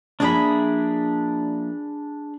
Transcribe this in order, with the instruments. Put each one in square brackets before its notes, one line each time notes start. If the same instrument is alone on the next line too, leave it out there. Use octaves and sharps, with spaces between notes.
[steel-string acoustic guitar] F3 A#3 E5 [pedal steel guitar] D4 G#4 B5